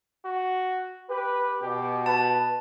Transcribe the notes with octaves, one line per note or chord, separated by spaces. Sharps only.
F#4
G4 B4
B2 G4
B4 A5